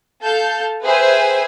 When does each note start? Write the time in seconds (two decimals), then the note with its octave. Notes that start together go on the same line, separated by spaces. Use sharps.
0.23 A4 F5 A5 G6
0.83 G#4 B4 C5 E5 G5 G#5